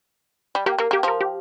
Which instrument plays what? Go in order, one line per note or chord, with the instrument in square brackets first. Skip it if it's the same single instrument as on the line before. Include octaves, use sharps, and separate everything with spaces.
[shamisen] G3
[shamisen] A#3 [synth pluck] G4
[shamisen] A#3 [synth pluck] A#4
[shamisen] A#3 [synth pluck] G4
[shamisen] F3 [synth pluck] A#4
[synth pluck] G4